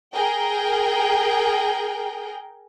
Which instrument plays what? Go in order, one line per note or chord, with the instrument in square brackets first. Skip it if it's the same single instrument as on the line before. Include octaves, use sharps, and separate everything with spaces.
[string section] G#4 A#4 G5